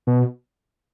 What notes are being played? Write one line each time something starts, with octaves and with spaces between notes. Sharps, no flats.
B2